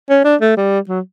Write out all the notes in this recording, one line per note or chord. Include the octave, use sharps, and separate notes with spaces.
C#4
D4
A3
G3
F#3